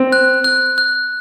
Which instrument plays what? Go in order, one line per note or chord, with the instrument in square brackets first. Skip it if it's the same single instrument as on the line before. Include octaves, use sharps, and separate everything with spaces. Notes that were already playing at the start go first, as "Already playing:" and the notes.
Already playing: [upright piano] C4
[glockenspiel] F#6
F#6
F#6